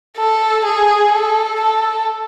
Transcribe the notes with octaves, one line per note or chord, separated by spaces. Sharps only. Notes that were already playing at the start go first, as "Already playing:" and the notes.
A4
G#4
A4
A4